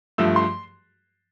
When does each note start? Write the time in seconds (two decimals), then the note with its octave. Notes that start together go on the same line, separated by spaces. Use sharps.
0.18 G2 F3 A3 E6
0.36 C6